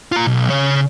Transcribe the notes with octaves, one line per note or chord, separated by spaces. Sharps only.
F4 A#5
B1
C#3 C#5